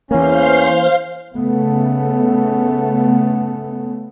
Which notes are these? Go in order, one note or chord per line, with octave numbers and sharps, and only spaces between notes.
E2 E3 A#3 C#4 C5 F5 C6
C#3 A3 B3